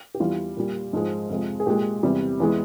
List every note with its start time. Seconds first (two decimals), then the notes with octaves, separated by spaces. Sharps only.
0.15 G4
0.20 E2 E3 G3 F4
0.57 A#2 G3
0.93 G#2 F3 G#3
1.30 F2 C3 F3 G#3
1.60 G#4
1.66 A#2 G#3 G4
2.03 E2 C3 G3
2.40 E2 E3 G#3